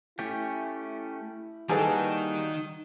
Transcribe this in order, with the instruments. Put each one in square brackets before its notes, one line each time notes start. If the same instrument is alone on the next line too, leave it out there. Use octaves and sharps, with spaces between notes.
[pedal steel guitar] A3 C#4 G4 [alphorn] E4
[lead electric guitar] D#3 D#4 [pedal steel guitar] G3 A#3 F#4 [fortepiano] G#4 A4 B4